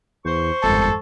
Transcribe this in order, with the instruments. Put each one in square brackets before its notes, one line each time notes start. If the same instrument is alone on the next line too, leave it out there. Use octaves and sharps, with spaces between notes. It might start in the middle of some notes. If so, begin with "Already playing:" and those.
[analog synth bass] E2 [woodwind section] C5 C#6
[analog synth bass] G1 [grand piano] F2 G#2 D#3 [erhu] A4